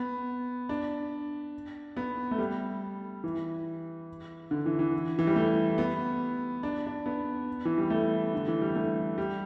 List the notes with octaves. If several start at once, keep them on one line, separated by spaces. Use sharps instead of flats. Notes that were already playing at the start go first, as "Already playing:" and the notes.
Already playing: B3
D4
B3
A3
G3
E3
D3
E3
E3
E3
G3
A3
B3
D4
D4
B3
E3
G3
A3
D3
E3
G3
A3
G3